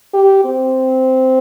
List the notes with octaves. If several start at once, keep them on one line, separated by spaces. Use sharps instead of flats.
G4
C4